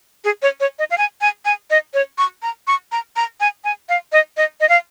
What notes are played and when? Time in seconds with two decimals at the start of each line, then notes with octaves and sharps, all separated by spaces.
0.24 G#4
0.42 C#5
0.60 C#5
0.79 D#5
0.90 F5
0.98 G#5
1.21 G#5
1.45 G#5
1.70 D#5
1.94 C#5
2.18 C#6
2.43 A#5
2.67 C#6
2.92 A#5
3.16 A#5
3.40 G#5
3.64 G#5
3.89 F5
4.12 D#5
4.37 D#5
4.60 D#5
4.69 F5